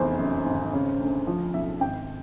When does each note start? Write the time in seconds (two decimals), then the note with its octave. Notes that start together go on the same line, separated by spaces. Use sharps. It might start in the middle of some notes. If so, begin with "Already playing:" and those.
Already playing: F1 E2 C5
0.19 F#2
0.46 G#1
0.73 C#3
1.00 D2
1.27 F3
1.54 B1 E5
1.80 G#1 G5